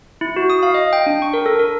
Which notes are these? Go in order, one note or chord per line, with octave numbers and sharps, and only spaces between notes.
E4
F#4
D#6
F5
D#5
G5
D4
C#6
A#4
A4
A#4